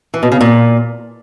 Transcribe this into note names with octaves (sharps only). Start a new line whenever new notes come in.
E3
B2
C#3
A#2